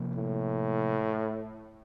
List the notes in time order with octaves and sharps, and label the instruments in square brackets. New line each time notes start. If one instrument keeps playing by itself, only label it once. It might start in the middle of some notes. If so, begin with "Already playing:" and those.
Already playing: [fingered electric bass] C3 F3 A#3
[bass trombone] A2